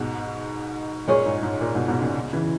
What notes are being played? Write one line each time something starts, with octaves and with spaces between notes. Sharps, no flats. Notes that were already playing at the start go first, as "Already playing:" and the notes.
Already playing: G#2 B2 G#3
A#2 G#3 C#4 G#4 C#5
G#2
G#2
A#2
G#2 B2
G#2 B2
A#2 C#3
C#3 E3